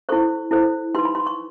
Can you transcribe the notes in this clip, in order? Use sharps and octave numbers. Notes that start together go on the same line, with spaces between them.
E4 A4 C5 C#6
E4 A4 C5
D#4 G4 B4 C6
B5
C6
C#6